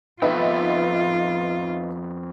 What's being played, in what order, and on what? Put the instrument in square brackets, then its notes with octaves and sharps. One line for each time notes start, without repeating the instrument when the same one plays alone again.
[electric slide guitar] F2 B3 G5 [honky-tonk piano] D#4 B4 E5 [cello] F4